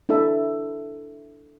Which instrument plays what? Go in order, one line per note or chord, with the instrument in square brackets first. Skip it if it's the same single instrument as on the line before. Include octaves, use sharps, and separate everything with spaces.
[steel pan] D4 E4 A4 E5